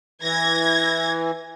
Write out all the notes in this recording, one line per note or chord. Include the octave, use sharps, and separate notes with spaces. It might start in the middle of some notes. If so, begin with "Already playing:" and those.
E3 G#6 A#6